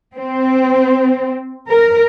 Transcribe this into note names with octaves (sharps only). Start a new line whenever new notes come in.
C4
A#4